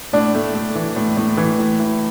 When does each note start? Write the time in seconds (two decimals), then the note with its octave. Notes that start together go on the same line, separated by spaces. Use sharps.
0.13 A2 D4
0.34 A3
0.54 A3
0.75 E3
0.96 A2
1.17 A2
1.37 E3
1.58 A2
1.79 E3